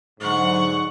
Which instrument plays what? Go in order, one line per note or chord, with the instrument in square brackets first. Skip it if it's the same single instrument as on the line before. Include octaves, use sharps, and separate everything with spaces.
[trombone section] G#2 [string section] D3 F#3 [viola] F#5 C#6